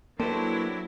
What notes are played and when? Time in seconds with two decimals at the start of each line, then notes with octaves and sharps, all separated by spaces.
0.20 F#3 A#3 D4 E4 G4 A4 B4 C5